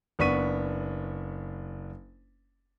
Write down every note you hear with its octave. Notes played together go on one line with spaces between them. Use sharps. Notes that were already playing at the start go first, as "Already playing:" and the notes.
F#1 B3 D4 C#6 B6 D#7